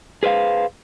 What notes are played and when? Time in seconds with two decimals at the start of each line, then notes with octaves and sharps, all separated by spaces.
0.23 G#4 B4 C5 E5 F5